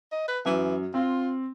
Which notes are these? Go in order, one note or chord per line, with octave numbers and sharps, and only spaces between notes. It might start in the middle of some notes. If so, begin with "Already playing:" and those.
D#5
B4
F#2 E3
C4 F4